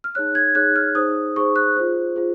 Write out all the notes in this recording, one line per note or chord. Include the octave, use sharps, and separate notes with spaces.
F6
D#4 G#4 C#5 F#6
G#6
D#4 G#4 C#5 F#6
F6
D#4 G#4 C5 D#6
D#4 G#4 C5 C#6
F#6
F4 G#4 C5
F4 G#4 C5